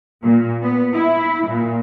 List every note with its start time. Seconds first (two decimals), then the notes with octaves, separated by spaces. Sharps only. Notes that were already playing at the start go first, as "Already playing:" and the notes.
0.22 A#2
0.62 B3
0.93 E4
1.48 A#2